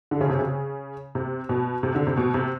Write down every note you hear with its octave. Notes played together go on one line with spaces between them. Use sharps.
D3
C#3
C3
C#3
C3
B2
C3
D3
C3
B2
C3